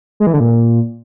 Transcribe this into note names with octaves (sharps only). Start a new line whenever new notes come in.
G#3
E3
D3
A#2